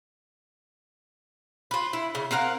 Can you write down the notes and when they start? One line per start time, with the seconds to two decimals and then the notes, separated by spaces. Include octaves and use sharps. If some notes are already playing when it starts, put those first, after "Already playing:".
1.71 F4 B4
1.93 E4
2.15 C#3
2.31 C4 A#4 F5 F#5